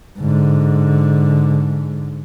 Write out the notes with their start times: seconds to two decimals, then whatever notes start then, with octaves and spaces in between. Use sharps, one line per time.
0.19 G#2 D3